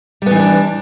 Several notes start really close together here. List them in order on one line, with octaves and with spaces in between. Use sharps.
G3 B3 E3 D#4 D4